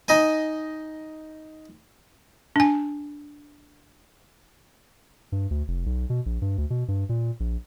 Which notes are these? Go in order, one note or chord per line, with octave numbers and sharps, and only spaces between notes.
D#4 D#5 G#5
D4 G#5
G2
D2
F1
B1
B2
A#1
G2
D2
B2
G2
A#2
A#1